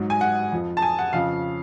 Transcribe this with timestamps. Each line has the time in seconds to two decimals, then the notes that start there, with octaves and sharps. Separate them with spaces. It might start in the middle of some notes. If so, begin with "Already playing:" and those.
Already playing: G#2 F#3
0.10 G#5
0.21 F#5
0.52 F2 F3
0.77 A5
0.82 G#5
0.99 F#5
1.13 F2 C#3 F3 F5